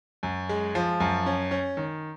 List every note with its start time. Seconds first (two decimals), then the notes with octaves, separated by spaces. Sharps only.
0.23 F#2
0.49 G#3
0.75 F3
1.00 F#2
1.26 C#4
1.51 C#4
1.77 D#3